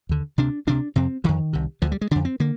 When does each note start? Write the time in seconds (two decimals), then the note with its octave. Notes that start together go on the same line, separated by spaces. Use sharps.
0.09 D#2 D3
0.38 D2 C3 D4
0.67 D2 C3 D4
0.96 F2 C3 C4
1.24 F2 D3 D#3
1.53 C2 C3
1.82 D2 D3 F3
1.92 G3
2.01 G#3
2.11 F2 D3 D4
2.25 C4
2.40 D3 A#3